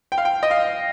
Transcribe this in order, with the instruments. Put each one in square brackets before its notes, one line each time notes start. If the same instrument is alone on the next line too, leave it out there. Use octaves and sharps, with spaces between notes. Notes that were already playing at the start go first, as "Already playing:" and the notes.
[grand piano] G5
F5
G5
D#5
F5